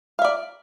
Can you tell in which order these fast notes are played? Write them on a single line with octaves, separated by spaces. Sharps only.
F5 E5 D5